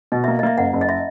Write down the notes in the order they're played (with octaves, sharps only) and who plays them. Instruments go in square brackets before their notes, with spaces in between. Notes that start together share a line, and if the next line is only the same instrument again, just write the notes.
[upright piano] B2 [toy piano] D#5
[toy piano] E5
[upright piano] A#3
[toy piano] D#5
[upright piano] A#3 [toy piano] E5
[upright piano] F#1 [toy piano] F#5
[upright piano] F#1
[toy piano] D#5
E5